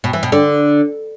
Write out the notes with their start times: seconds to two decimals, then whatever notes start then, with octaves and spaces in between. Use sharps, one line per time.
0.04 B2
0.13 E3
0.23 B2
0.32 D3